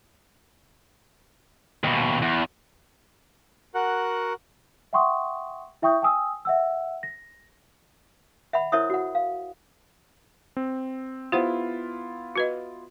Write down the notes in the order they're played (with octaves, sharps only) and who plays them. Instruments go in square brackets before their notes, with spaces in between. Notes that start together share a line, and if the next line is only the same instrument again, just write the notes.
[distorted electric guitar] D#2 B2
E2
[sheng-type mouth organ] F#4 A#4 F#5 F#6
[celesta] E5 F#5 G5 C6 C#6 D#6
E4 E5 G5 C#6 D#6 G6
G5 G#5 D#6 E6
E5 F#5 E6
A#6
[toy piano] E5 F#5 B5
E4 A#4 C5 C#5 E5 D#6
F#4 F#5
F5
[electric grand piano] C4
[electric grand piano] B3 E4 F4 [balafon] G4 C5 F#5
[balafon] F#4 B4 D#5